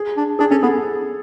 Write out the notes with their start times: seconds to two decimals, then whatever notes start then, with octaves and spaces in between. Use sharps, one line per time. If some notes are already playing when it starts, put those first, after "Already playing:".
Already playing: G#4
0.17 D4
0.39 D4 G#4
0.51 C#4 A4
0.63 B3 G#4